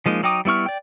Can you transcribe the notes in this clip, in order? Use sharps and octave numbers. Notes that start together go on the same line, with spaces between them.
F3 G#3 A#3 D#4
F#3 D#4 G5 D6 D#6
G3 B3 E4 C#6 F6
D5 G5